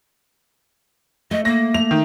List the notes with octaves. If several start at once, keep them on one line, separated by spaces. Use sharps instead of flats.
A3 D#5
A#3 A#6
A3 F7
D#3